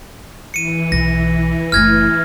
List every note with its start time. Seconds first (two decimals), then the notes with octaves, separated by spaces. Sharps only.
0.54 E3 C#7 D#7
0.92 B1 A#6
1.72 F#1 A3 F6 G#6 A#6